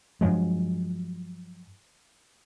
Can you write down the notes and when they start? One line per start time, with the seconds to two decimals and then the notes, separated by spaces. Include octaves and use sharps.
0.21 G2 F3 F#3 G#3